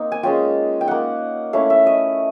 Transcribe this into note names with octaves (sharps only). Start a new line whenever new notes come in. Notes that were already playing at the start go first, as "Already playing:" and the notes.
Already playing: A#3 C4 D#4
G#5
G#3 C#4 F4 G5
G5
A#3 D#4 F#5
A3 C#4 E4 F5
E5
D#5